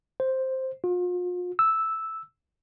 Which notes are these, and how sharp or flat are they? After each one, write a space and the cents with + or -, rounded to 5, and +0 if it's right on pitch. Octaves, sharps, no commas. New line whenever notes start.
C5 +5
F4 +40
E6 -5